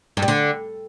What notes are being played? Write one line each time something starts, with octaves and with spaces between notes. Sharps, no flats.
G2
G3
D3